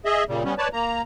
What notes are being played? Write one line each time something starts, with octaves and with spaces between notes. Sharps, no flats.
G#4 D#5 E5
A#2 C#3 G3
G3 B3 C#4
B4 C#5 D5 A5
A#3 A#5